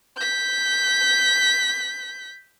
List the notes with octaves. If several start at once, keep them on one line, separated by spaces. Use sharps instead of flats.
G6 B6